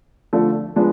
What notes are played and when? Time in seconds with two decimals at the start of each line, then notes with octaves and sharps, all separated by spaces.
0.33 D3 F3 A3
0.76 F3 G#3 B3 D4